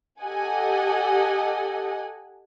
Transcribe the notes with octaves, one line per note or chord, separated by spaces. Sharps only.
G4 A4 D#5 F#5 G#5